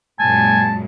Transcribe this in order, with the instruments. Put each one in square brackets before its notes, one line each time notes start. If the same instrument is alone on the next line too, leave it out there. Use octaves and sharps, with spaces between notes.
[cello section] F#2 A#2 G#3 [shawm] G#5 [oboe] A5